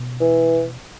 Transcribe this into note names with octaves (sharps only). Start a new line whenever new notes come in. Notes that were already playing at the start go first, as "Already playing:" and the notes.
Already playing: B2
E3